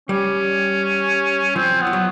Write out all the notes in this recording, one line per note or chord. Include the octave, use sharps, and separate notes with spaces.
G3 C#4
F3 C4
B3
F3
F#3